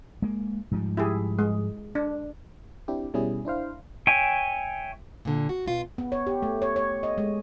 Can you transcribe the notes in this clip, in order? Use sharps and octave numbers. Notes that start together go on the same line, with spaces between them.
G#3 A#3
G#2 F3 G3
E4 G4 G#4
G#3
D4
C4 D4 E4 G4
B2 G3 C#4 E4 G#4
D4 E4 C5 F5
C#5 E5 G5 G#5
A#2 D3
F#4
B2 F4
B3
C#5
G4
A3
C#5
C#5
D#5
G#3